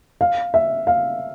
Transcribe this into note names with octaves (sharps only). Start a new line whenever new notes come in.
F5
E5
F5